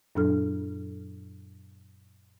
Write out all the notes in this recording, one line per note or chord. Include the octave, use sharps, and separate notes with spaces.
F#2 A#2 F#3 D4 A4 F6